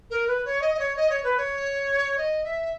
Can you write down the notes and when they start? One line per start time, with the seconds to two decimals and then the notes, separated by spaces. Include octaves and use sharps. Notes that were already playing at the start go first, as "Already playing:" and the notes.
0.10 A#4
0.27 B4
0.45 C#5
0.62 D#5
0.74 D#5
0.79 C#5
0.97 D#5
1.10 C#5
1.24 B4
1.37 C#5
2.18 D#5
2.44 E5